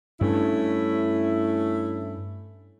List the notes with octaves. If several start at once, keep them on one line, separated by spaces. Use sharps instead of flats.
G2 A3 C#4 D4 E4